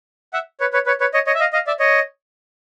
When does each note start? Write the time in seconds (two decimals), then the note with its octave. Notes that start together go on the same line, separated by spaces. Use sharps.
0.33 E5 F#5
0.60 B4 C#5
0.73 B4 C#5
0.86 B4 C#5
1.01 B4 C#5
1.14 C#5 D#5
1.27 C#5 D#5
1.34 E5
1.40 D#5 F5
1.53 D#5 F5
1.67 D5 E5
1.80 C#5 D#5